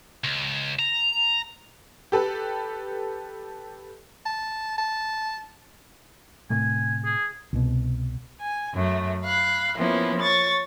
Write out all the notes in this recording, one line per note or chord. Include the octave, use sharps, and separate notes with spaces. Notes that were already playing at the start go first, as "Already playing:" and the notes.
C#2
A#5
G4 A4 B4
A5
A5
A2 C3 A3 G#5
G#4
C2 B2
G#5
F#2 A3
F5 B5 F#6
F3 A#3 B3 C#4 E4
C#5 C#6 A6